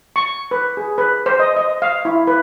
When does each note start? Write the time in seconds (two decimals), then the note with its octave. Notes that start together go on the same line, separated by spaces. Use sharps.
0.16 C#6
0.51 B4
0.77 G#4
0.98 B4
1.26 C5
1.39 D#5
1.56 D#5
1.82 F5
2.05 E4
2.27 B4